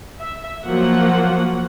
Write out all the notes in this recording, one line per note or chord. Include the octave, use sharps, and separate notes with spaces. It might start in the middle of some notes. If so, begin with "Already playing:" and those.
E5
F3 F#3 A#3 F#5